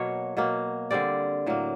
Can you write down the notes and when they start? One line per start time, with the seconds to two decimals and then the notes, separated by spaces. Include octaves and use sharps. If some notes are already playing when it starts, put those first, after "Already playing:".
Already playing: B2 F#3 A#3 C#5
0.37 B2 F#3 A#3
0.91 D3 G3 C4 D5
1.46 A2 F#3 A#3